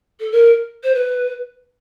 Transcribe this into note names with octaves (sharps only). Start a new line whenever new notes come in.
A4
A#4
C5
B4